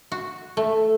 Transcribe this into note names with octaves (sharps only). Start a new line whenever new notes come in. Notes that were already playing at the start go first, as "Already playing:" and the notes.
F#4
A3